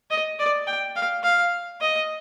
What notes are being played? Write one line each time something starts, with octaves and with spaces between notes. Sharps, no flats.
D#5
D5
G5
F5
F5
D#5